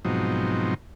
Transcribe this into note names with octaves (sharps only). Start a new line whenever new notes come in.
G#2 B2 F3 F#3 C4 D#4